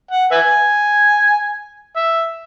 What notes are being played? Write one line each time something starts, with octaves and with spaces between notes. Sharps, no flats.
F#5
B4 E5 G#5
E5